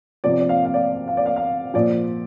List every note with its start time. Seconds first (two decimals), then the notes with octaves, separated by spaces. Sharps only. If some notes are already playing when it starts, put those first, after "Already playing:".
0.24 C3 F3 D5
0.41 D5
0.49 F5
0.65 F5
0.74 D5
1.08 F5
1.17 D5
1.26 F5
1.36 F5
1.74 A#2 F3 D5